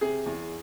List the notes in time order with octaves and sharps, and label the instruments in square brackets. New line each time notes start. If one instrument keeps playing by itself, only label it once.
[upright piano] C3 G#4
E2